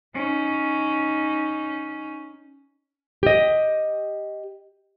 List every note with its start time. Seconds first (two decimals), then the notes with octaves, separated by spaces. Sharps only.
0.14 C#4 D#4
3.23 G4 D#5